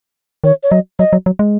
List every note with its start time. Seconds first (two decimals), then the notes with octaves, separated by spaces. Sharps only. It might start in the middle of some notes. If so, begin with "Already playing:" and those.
0.44 D#3 C#5
0.63 C#5
0.71 F#3 D#5
0.99 F#3 D#5
1.13 F#3
1.26 F#3
1.39 G#3